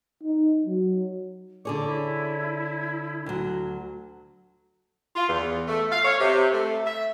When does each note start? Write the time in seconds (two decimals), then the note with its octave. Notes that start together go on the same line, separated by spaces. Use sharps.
0.23 D#4
0.67 F#3
1.65 D3 G#4 C#5 D6
1.86 E4
3.26 D2 F#3
5.16 F4
5.29 E2
5.68 A3
5.92 F5
6.05 C#5
6.20 C3
6.53 A3
6.86 E5